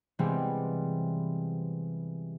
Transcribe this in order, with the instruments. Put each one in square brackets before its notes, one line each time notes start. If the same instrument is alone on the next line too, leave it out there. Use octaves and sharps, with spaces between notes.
[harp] C3 E3 G3 G#3 B3 C4